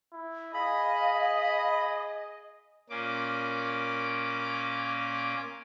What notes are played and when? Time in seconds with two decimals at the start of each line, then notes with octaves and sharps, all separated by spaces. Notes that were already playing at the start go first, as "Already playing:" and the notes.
0.13 E4
0.54 G#4 D#5 F5 B5
2.90 A#2 A#3 C#4 D6